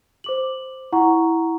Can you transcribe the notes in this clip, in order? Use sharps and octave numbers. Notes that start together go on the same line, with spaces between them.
C5 D6 F#7
E4 F#5 A#5 C#6